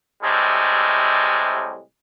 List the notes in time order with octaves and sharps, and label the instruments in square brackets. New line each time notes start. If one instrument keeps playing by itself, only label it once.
[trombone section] A2 C3 G3 G#3